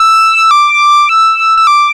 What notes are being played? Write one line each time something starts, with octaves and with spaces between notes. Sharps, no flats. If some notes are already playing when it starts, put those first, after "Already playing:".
Already playing: E6
D6
E6
E6
D6